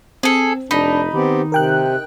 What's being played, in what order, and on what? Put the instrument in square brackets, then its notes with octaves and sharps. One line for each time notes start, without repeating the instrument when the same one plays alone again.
[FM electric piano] C4 [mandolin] G#4 A4
[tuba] F1 [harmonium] D4 [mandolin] D#4 [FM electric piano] B5
[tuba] D#3 [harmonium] B3 C4 G4
[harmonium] C3 [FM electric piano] A#4 G5 F#6